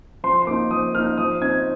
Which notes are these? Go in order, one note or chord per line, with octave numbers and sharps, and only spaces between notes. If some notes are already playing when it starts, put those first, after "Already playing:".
F3 C6
C6
A#3 D#4 D6
F3 D#6
A#3 D#4 F6
F3 D#6
C4 D#4 G#6